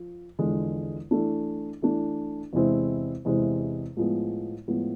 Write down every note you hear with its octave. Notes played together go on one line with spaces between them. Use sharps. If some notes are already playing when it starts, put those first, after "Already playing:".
Already playing: F3
E2 D3 F3 G#3
E3 A3 D4
E3 A3 D4
E2 C3 G#3 C4 E4
E2 C3 G#3 C4 E4
A2 F3 G#3 B3
A2 F3 G#3 B3